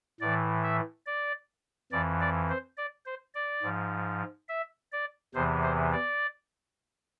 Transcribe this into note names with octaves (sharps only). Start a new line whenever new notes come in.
A2 E3 D5
E5
D5
F2 E3 D5
D5
C5
D5
C5
D5
G#2 F3
E5
D5
E2 C3 E3 C5
C5
D5